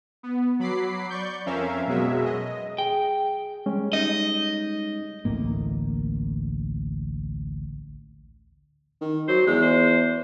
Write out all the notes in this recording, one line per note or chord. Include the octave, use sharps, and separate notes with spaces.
B3
F#3 B5 D6 C7
D5 C#6 G6
F2 C#4 A#4 E5 F5
B2 F#3 G#3 G#4 E5
D#5
G#4 G5
G3 G#3 C#4
D#4 D#5
A1 D2 A2 A#3
D#3
F#3 C5
E2 G#3
C5